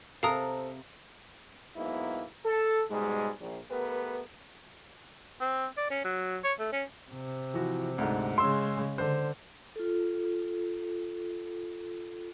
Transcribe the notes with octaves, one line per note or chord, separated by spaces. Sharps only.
C3 A4 A#4 C5 F5 A#5 D#6
G#2 F#3 A#3 B3 E4
A4
G#2 B2 G3 G#3
A#1
A3 B3 G4 A#4 B4
C4
D5
C#4
F#3
C#5
A3
C#4
C3
E3 F3 F#4
D2 G#2
C#3 G#3 C6 E6
D3 C5
F4 A4